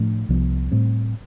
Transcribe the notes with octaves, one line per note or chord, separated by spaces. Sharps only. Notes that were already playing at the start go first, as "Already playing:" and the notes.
Already playing: A2 F3 A3 D4
C2 C3 F3 B3
A2 G3 C4